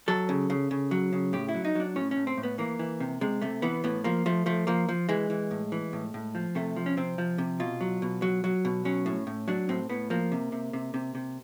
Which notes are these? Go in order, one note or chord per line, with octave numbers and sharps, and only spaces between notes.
F#3 A4
C#3
C#3
C#3
F#3
C#3
A2 G4
E4
F#3
D#4
F#3 D4
A2 C#4
C#4
A2
C4
A2
B3
E3 A#3
E3
C3
C3 G#3
C3 A3
E3 B3
A2 B3
F3 A#3
F3 A3
F3 A3
F3 A#3
F3
E3 G#3
E3
A2
E3
A2
A2
F3
C3 A3
F3
C#4
C3 C4
F3
C3
B2 F4
F#3
B2
F#3
F#3
B2
F#3 C#4
A2
A2
F#3 D4
A2 C4
A2 B3
F3 A#3
C3
C3
C3
C3
C3